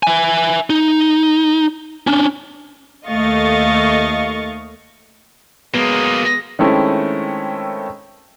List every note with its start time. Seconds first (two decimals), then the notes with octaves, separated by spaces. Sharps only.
0.03 E5 G#5
0.70 D#4
2.07 C#4 D4
3.09 D#2 A3 D#5 F5 C#6 A6
5.74 F#3 G#3 A#3 B3 D#6
6.59 D#3 G#3 A3 C4 C#4 E4